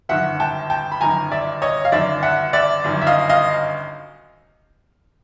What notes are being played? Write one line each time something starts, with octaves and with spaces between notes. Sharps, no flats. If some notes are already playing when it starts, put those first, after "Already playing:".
G1 F#2 D#3 E5 F#5
G5 A5
G5 A5
B5
G1 F#2 D#3 G#5 A#5
D5 E5
C#5 D#5
F5
G1 F#2 D#3 D5 E5
E5 F#5
D5 E5
G1 F#2 D#3
E5
D#5 F5
D#5 F5